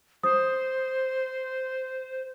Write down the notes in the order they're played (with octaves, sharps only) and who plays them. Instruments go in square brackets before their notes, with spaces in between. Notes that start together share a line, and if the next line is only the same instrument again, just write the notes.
[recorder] C5 [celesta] D#6